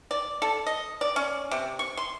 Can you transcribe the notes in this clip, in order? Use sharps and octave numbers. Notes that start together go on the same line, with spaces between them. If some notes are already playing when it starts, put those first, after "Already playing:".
D5
A4
D#5
D5
C#4
C3
C#6
C6